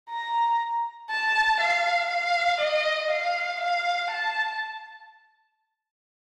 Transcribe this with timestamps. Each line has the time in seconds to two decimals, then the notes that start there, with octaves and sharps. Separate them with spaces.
0.10 A#5
1.11 A5
1.60 F5
2.10 F5
2.60 D#5
3.11 F5
3.61 F5
4.11 A5